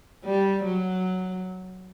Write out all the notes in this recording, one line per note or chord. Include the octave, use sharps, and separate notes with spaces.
G3
F#3